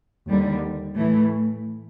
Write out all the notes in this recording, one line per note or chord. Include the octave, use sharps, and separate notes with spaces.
D#2 D3 G3
A2 E3 A3